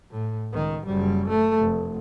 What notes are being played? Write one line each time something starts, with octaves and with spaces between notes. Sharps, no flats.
A2
C#2 D#3
F#1 G3
A3
F1